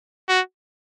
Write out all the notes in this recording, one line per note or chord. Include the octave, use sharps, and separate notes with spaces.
F#4